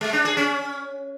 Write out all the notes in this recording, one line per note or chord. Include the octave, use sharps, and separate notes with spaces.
G#3
D4
G#4
C#4